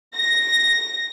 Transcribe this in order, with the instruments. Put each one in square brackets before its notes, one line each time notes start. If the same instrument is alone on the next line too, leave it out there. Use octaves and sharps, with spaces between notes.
[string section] A#6